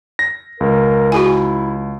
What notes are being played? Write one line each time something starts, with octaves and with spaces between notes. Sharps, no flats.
A#6
C#2 A#4
E4 F#4 G#4 G#5